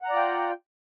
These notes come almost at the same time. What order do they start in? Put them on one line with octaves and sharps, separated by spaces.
F#5 A#5 D5 F4 G5